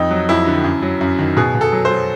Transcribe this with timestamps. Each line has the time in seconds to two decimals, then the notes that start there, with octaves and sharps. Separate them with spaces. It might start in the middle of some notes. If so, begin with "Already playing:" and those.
Already playing: F2 D#4
0.11 F#3
0.29 F2 E4
0.47 D3
0.64 F#2
0.82 F#3
1.01 F#2
1.19 D#3
1.37 B2 G#4
1.55 B2
1.61 A4
1.72 F#3
1.85 C5
1.91 F#3